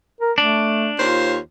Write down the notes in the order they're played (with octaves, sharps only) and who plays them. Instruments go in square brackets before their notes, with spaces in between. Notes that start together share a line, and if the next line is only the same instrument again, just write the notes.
[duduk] A#4
[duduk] A3 [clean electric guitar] D4
[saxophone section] D#2 C5 C#5 [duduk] F4